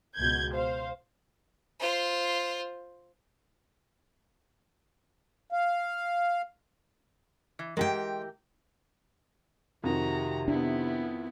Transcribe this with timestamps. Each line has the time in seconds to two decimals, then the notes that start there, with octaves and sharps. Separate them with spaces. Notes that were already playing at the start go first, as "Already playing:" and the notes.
0.17 C#2 B2 G6 G#6
0.54 C5 F5
1.80 F4 C5
5.52 F5
7.59 E3
7.77 E3 G#3 G4 A#4 G5
9.84 F2 C3 D#3 F#4 A#5
10.48 B3 D4 E4